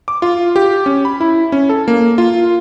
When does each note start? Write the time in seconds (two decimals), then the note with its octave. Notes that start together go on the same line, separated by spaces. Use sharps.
0.08 D6
0.22 F4
0.56 G4
0.86 C#4
1.05 B5
1.20 E4
1.52 C#4
1.69 A4
1.88 A#3
2.18 F4